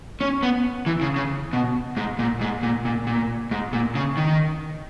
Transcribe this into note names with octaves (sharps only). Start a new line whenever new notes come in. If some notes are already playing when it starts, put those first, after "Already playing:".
C#4
B3
E3
C#3
C#3
B2
G#2
A#2
G#2
A#2
A#2
A#2
G#2
A#2
C#3
D#3